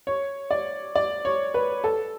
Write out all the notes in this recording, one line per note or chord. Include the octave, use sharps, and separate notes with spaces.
C#5
D5
D5
C#5
B4
A4